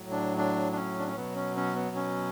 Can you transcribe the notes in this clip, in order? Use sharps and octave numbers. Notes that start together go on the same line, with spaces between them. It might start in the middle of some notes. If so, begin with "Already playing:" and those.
Already playing: A2 F#3
D4
D4
D4
C#4
D4
C#4
B2 F#3 B3
C#4
C#4
B3
C#4